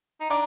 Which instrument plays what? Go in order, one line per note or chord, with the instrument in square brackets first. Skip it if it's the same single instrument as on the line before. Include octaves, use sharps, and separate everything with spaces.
[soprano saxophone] D#4
[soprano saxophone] D4 [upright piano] A#5 D6